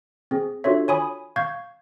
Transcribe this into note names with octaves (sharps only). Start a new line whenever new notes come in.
C4 G#4
D4 F4 F#4 A4 C#5 E5
C#5 G#5 B5 D#6
F5 C#6 G6 G#6